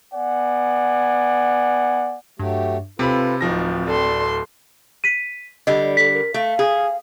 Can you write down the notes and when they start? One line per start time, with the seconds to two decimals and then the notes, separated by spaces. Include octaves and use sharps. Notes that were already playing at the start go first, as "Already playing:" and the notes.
0.13 B3 D5 F#5 G#5
2.39 G2 F#3 A3 G4
2.99 C3 C4 F4 A4 B4 B5
3.41 D1 F3 D#4 A#6
3.87 D1 A4 D5 C6
5.04 B6 D#7
5.67 D3 G3 D#5
5.97 A4 B6
6.13 A#4
6.34 A3 F5
6.59 G#4